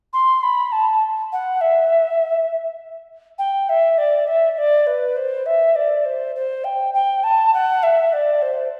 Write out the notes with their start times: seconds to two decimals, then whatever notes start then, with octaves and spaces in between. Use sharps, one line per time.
0.13 C6
0.43 B5
0.72 A5
1.33 F#5
1.61 E5
3.39 G5
3.69 E5
3.98 D5
4.28 E5
4.58 D5
4.87 B4
5.16 C5
5.46 E5
5.76 D5
6.06 C5
6.36 C5
6.64 G5
6.94 G5
7.24 A5
7.54 F#5
7.83 E5
8.13 D5
8.42 C5